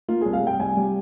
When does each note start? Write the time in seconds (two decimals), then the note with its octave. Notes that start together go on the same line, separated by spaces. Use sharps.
0.08 A#3 F4
0.21 C2 G#4
0.33 F5
0.43 C2 G5
0.59 C2 G#5
0.77 G3